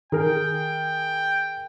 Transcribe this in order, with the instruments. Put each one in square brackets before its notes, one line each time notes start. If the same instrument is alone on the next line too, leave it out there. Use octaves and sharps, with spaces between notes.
[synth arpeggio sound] D#3 [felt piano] G#4 A#4 [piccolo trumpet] G5